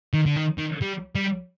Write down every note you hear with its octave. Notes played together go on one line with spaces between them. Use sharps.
D#3
D3
D#3
D#3
G3
G3